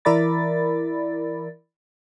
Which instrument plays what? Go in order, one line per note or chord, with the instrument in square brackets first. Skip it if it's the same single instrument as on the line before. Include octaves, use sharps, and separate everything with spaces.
[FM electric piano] E3 E4 A#4 D5 B5 A6